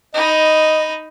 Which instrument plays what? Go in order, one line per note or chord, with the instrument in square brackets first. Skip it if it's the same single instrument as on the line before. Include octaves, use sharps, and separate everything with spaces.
[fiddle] D#4 B5 [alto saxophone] D#5